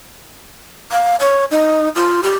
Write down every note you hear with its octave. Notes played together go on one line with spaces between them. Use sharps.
F5
C#5
D#4
F4
G4